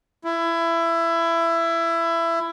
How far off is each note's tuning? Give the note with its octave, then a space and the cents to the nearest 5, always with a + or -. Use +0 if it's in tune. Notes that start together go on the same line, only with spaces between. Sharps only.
E4 +20